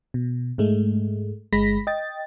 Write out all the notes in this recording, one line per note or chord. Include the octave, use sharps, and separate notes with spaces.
B2
G#2 G#3 A3
G1 G#3 B5 A#6 B6
D#5 G5 A6